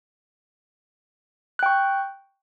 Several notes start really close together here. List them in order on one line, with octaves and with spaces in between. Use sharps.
F#6 G5 C#6